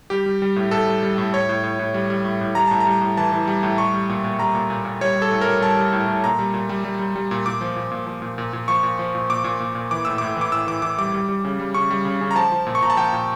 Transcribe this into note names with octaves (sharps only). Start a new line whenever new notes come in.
G3 G4
G3
G3
A2
A2 A4
G3
G3
A2
A2 C#5
A2
A2
A2
G3
G3
A2
A2
G3 A#5
A2 A5
A#5
G3
A2
E3 A5
E3
G3
A2
G3 C#6
G3
A#2
A#2
G3 A#5
A#2
A#2
A#2
G3 C#5
G3
A4
A2
A#4
G3
G3 A5
G3
A2
A2
A#2 A#5
G3
A#2
G3
G3
G3
G3
A#2
A#2 D6
F3
A#2
A#2
F3
A#2
A#2
A#2
F3 C#6
A#2
F3
A#2
A#2 D6
A#2
A#2
A#2
E3 D6
A2 E6
A2 D6
E3 D6
A2 E6
E3 D6
E3 D6
G3 D6
G3
G3
C#3
G3
C#3 C#6
G3
C#3
C#3
A#5
F3 A5
F3
A#2
C#6
A#2 A#5
A5
F3 G5
A#2